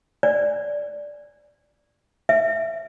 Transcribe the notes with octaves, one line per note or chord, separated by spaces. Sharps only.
D5
E5